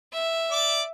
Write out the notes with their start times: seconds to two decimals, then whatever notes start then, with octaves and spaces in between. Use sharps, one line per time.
0.13 E5
0.51 D5 D6